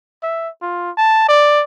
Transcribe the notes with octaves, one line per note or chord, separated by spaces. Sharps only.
E5
F4
A5
D5